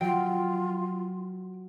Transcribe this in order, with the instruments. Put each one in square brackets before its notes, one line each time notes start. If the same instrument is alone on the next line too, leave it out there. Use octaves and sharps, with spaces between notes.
[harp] F#3 [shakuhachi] F4 [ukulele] G5